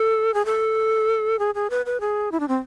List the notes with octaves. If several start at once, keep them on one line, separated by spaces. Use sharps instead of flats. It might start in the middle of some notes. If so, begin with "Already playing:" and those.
Already playing: A4
G#4
A4
G#4
G#4
B4
B4
G#4
E4
D4
C4